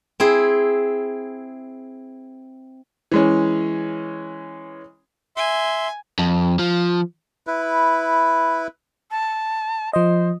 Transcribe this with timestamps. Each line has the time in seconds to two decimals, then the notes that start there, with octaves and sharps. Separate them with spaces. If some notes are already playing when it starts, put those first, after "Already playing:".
0.20 C4 E4 G#4
3.11 E3 G#3 C#4
5.37 E5 G#5 C6
6.19 F2
6.59 F3
7.47 E4 B4
9.11 A5
9.93 F3 C5 D#5